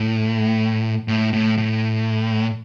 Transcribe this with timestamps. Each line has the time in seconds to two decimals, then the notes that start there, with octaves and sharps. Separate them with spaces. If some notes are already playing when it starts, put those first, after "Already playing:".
Already playing: A2
1.08 A2
1.33 A2
1.57 A2